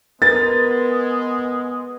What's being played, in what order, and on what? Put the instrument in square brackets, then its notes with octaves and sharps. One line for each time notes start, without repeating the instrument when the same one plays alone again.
[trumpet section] G#3 [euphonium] B3 [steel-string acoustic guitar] A#4 B4 [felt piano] A6